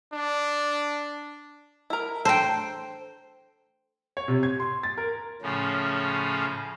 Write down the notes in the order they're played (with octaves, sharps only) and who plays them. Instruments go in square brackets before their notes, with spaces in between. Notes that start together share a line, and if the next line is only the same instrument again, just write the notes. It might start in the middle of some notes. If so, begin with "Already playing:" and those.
[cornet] D4
[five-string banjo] E4 A#4
[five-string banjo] A4 A#5 [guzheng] C5 G5
[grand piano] C#5
C3
G#6
C6
A6
A#4
[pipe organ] A2 C#3 F3 C#4